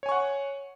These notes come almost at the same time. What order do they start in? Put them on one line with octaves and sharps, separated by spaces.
C#5 G#5 C#6 F#5